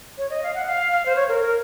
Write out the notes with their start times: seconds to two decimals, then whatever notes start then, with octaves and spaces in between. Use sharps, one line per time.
0.18 C#5
0.30 D#5
0.43 F5
0.54 F#5
0.67 F5
0.92 F5
1.06 C5
1.16 C#5
1.29 A#4
1.41 A#4